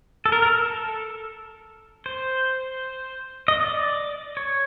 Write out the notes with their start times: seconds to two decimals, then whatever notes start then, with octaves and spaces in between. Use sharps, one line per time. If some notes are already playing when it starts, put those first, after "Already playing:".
0.26 A4
0.32 A#4
0.42 A#4
0.51 A4
2.06 C5
3.48 D#5
3.60 D5
4.37 C#5